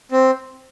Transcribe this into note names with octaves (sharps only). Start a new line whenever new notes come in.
C4